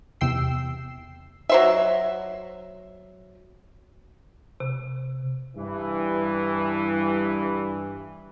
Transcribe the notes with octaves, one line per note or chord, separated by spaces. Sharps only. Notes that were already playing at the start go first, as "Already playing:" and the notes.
E2 C3 G5 E6 C7
F#3 C5 E5
C3
G2 E3